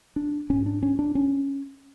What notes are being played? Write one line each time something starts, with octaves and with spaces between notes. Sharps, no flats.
D4
G#1 G#2 C#4
D4
C#4
D4
C#4